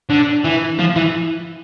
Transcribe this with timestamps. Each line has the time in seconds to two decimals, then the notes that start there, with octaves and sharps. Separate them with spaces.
0.10 D3
0.45 E3
0.79 F3
0.96 E3